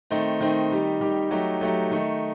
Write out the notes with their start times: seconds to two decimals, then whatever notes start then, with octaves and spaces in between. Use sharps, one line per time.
0.11 D#3 A3 C4 D#4
0.40 D#3 A3 C4 D#4
0.71 D#3 G3 D#4 G4
1.01 D#3 G3 D#4 G4
1.31 F#3 A3 D#4 G4
1.61 F#3 A3 D#4 G4
1.91 D#3 A3 D#4